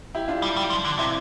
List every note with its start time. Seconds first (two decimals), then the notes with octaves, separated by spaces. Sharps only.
0.15 E4 G4
0.28 D4 F4
0.42 G3
0.57 G3
0.70 F3
0.85 D3
0.99 C3 C4 E4